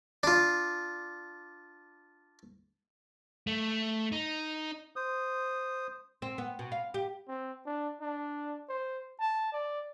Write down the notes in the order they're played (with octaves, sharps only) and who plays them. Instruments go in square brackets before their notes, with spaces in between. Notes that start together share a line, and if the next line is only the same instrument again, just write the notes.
[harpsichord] D4 F4
[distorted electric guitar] A3
D#4
[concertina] C5 D#6
[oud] C4
B3
B2
F5
G4
[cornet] C4
D4
D4
C5
A5
D5